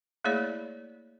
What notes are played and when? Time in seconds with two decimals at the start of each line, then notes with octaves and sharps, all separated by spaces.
0.24 A3 A#3 E4 G#4 C#5 D5